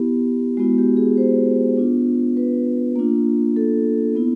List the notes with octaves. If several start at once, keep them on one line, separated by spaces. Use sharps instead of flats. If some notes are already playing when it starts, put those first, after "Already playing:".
Already playing: B3 E4 G4
G#3 B3 E4 F#4
G4
G#4
C5
B3 D4 F4
B4
A#3 D4 F4
A4
B3 E4